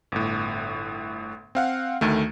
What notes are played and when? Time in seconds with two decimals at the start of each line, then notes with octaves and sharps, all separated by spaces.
0.12 G1 A2
1.55 C4 F5 F#5
2.01 D2 D#3 A3